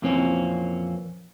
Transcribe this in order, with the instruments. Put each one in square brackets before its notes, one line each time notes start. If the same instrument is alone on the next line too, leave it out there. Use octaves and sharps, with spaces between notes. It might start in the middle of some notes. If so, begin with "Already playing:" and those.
[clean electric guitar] F2 A#2 E3 A#3 C4 C#4